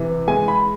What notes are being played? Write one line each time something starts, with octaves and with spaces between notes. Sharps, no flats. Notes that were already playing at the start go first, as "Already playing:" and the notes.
Already playing: C3 E3
G#3 G#5
B5